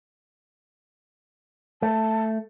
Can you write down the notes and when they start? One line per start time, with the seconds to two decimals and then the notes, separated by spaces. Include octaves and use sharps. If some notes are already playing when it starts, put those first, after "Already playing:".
1.82 A3 A5